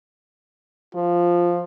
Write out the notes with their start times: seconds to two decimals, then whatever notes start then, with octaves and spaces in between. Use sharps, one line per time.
0.95 F3 F4